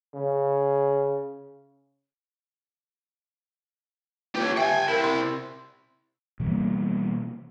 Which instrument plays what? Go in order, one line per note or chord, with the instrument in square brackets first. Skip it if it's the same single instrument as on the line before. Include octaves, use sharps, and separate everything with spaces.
[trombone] C#3
[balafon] F4 B4 [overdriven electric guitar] G4 C#5
[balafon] G4 E5 [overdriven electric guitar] G5 G#5
[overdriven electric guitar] C3 E4 [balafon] A#4
[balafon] C6
[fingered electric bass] B2 E3 G3 A#3